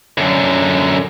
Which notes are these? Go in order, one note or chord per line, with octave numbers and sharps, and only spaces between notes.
F#2 D3